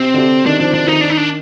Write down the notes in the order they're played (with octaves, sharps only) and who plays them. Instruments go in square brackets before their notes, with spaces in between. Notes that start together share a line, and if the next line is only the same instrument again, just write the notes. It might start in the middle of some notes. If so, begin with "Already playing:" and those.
Already playing: [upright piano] C3 [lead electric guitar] C4
[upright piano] D3
C3
[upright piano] D#3 [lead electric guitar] D4
[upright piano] F3 [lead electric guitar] D4
[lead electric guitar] D4
[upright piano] D#3 [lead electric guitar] D#4
[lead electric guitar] D4
D#4
D4